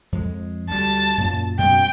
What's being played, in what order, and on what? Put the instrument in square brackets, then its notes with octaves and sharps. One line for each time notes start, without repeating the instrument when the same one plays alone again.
[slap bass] F2 G#3
[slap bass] D2 G3 [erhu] A5
[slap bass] F#2 A#2
[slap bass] F#2 B2 G#3 [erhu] G5